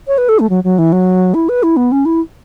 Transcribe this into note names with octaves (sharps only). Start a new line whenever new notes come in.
C#5
B4
A4
A3
F#3
F#3
E3
F#3
E4
B4
E4
B3
C#4
E4